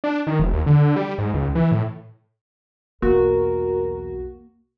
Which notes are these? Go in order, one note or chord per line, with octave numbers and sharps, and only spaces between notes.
D4
D#3
E1
D#2
D3
D3
G3
G#2
C#2
E3
A2
B1 E2 A#3 F#4 A#4